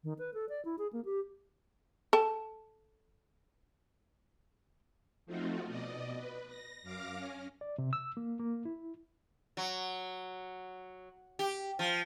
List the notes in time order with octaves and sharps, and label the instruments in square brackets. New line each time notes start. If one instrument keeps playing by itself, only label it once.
[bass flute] D#3
B4
A4
D5
E4
G#4
A#3
G4
[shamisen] A4 G5 A5
[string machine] F3 A3 C4 D#4 F4 F#4
B2 D5 D#5
B4
A#6
F#2 F5 D6 F6 A#6
C#4
[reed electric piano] D5
C3
E6
A#3
A#3
E4
[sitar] F#3
G4
F3